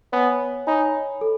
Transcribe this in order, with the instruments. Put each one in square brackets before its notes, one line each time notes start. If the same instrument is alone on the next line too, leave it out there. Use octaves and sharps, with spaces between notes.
[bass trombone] B3 [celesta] C#5 G#5 B5
[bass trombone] D#4 [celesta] C#5 G#5 B5
[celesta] A4